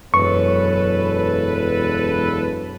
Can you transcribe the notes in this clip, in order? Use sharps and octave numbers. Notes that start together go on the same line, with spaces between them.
E1 F#2 A4 B4 C#6